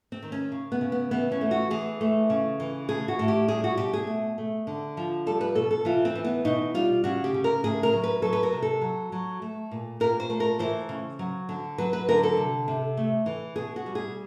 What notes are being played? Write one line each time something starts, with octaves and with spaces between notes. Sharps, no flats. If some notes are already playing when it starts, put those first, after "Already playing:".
C4
D#3
C#4
C#3
B3
C#3
B3
E3 B3
C#4
A3
F#4
E3 G#4
A3
C#3
E3
A2 G#4
F#4
A2
G4
G3 G#4
F#4
B2 G4
G#4
A3
A3
D3
F3
G3 A4
B4
B2 A4
A4
E3 F4
C4
E3
B3
B2 D#4
G3 F4
C#3 F#4
G4
C#3
A#4
A2 G#4
A#4
F#3
B4
F#3 A4
B4
A#4
C3
A4
F#3
F#3
A3
A#2
A#2 A#4
C5
A3
A#4
E3 C5
C#3
F#3
D3
F#3 B4
B4
D3 A#4
A4
C3
C3
A3
E3
B2 G#4
F#4
G3
G#4